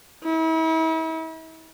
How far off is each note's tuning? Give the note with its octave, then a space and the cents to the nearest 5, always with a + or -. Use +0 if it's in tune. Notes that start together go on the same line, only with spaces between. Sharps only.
E4 -40